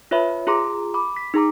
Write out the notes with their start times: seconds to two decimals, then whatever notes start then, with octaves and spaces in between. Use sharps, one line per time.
0.11 F4 B4 C#5 E5 B5
0.47 F4 G#4 A#5 C6 D6
0.94 B5 D6
1.17 B6
1.34 D#4 G#4 A#5 D6